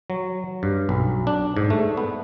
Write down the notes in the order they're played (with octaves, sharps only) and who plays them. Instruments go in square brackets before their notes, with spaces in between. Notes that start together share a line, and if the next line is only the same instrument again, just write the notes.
[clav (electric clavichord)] F#3
G2
B1
D4
G#2
A3
B3